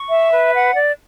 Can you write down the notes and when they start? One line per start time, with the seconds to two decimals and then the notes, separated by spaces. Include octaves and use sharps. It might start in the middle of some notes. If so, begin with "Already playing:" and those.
Already playing: C#6
0.10 E5
0.32 B4
0.54 F#5
0.75 D5